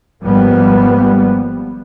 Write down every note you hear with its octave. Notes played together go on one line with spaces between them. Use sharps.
G#1 F3 G3 A#3 B3